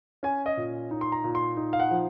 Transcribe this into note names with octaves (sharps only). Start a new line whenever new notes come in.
C#4 G#5
D#5
A#2
D#4
C6
A#5
A#2
C6
D#4
F5
F#5
F3